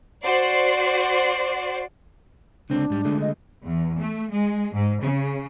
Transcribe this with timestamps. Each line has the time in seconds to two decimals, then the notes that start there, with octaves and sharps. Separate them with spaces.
0.23 F#4 C5 D5 C7
2.70 C#2 D3 C4 D4
2.90 G#2 G3
3.05 D3 G#3 A3
3.21 D#5
3.64 E2
3.99 A3
4.30 G#3
4.74 G#2
5.03 C#3